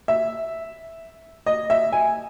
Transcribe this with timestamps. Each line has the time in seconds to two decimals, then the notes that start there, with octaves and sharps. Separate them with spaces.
0.08 E5
1.46 D#5
1.70 E5
1.92 G#5